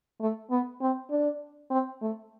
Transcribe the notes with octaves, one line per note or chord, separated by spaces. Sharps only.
A3
B3
C4
D4
C4
A3